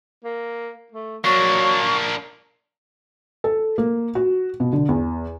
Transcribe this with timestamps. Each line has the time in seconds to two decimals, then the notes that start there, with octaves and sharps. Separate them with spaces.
0.24 A#3
0.92 A3
1.24 F#3 A#3 D4 C#6
3.44 A4
3.78 A#3
4.15 F#4
4.60 B2
4.73 D3
4.89 E2